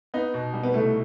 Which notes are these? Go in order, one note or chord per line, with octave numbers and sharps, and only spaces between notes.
B3 D#4
B2
G3
B3
C2 A3